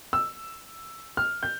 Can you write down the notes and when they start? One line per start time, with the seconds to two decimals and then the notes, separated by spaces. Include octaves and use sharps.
0.13 E6
1.17 F6
1.43 G6